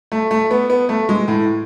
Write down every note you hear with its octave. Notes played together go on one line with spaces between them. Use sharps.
A3
A3
B3
B3
A3
G#3
A2